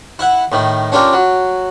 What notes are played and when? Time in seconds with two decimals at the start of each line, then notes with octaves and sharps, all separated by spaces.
0.19 E4 E5 F#5
0.52 A2 D#3
0.92 C#4 D4 F4 G4 A#4
1.13 F#3